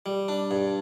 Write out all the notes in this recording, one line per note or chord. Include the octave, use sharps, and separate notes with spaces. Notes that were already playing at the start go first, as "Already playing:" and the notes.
G3
D4
G2